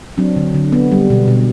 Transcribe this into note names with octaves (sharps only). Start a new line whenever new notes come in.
F#3 C4 D4
D3
D3
B3
G3
B2
B2